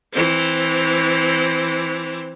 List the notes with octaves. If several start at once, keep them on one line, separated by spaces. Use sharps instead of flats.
E3 C4